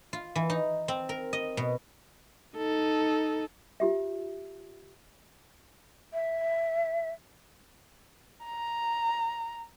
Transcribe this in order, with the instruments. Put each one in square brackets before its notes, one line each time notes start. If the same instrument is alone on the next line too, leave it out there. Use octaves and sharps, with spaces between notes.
[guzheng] F4
E3
D#4
C4
A#4
D#5
B2
[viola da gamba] D#4 A4
[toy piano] F4 G4 E5
[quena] E5
[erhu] A#5